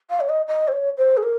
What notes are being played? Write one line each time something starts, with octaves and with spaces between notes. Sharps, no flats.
F5
C#5
D#5
D#5
C5
C#5
C5
G#4
A#4